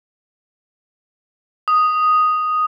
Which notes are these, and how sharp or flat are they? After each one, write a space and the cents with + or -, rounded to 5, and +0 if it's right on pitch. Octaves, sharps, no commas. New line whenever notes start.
D#6 +0